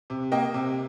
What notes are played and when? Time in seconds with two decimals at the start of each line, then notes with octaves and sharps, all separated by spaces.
0.10 C3
0.32 A#3 D#5 G5
0.54 C3